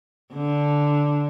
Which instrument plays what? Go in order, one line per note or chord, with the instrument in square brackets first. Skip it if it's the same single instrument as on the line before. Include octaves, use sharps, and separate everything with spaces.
[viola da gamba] D3